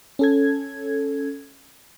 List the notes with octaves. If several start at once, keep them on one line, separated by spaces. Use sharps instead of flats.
C#4 A4 G#6